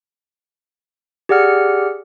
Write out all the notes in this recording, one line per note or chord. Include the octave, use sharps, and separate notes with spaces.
G4 G#4 D5 F#5 F6 C#7